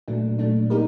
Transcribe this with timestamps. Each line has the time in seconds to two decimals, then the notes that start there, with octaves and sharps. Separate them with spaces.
0.08 A#2 F#3 A3 D4
0.39 A#2 F#3 A3 D4
0.70 A#3 D#4 G4 A#4